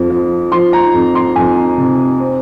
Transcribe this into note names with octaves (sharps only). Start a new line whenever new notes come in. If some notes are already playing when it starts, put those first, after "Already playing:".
Already playing: F2 F3
F3
F3 C6
A#5
F2
C6
F2 G#5
C3
C4